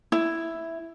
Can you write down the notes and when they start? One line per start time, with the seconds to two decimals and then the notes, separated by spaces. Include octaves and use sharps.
0.12 E4